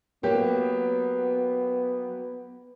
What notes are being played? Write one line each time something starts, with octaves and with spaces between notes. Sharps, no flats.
F#3 A#3 B3 G4